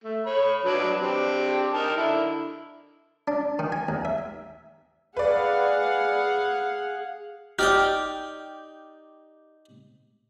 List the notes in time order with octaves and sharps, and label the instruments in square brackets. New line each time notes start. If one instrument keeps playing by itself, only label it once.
[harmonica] A3
C#5 B5
F#3 D4 B4
C4 D4 G4
D#4 A#4 A5
D3 E4
[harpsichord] D4
D#3
G#5
D#2
E5
[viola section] G#4 F5 F#5 [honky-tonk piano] B4 D5
[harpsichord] D#4 D5 G5 [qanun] G4 [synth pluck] F6